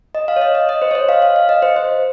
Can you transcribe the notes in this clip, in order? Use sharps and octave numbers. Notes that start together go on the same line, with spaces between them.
D#5
F5
C#5
D#5
D#5
D#5
C5
C#5
D#5
F5
F5
F5
D#5
C5
C5